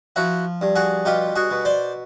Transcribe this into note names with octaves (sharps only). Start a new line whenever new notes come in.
F3 E4 F#4
G2
F#4 G#4
B2 F4 G4
F#4 G#4
B2
C5 D5